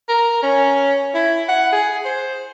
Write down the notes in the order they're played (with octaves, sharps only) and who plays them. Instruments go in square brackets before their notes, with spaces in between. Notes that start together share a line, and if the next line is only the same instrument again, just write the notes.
[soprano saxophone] A#4
C#4
E4
F#5
G#4
C5